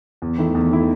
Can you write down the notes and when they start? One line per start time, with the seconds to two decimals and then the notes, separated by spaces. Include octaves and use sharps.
0.22 E2
0.38 D#3 A3 E4
0.55 E2
0.71 D#3 A3 E4